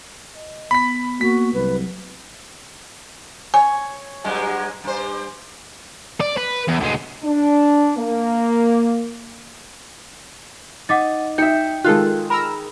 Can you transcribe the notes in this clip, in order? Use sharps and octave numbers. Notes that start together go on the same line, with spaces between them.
D#5
B3 B5 B6
A#3 F#4 B6
C2 F#3 B4
C#5 G#5
G2 F#3 G#3
G2 C5
D5
B4
E2
D2 G#3
D4
A#3
D#4 F#5 D6 A6
D#4 E5 G5 G6 C#7
D#3 G#3 F4 A4 F#6
A#4 A#5 B5 E6